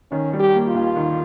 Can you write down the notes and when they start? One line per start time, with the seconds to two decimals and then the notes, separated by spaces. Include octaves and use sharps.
0.12 D#3 C#4
0.33 G3
0.40 G4
0.54 A#3
0.68 F4
0.75 D#2
0.96 D#3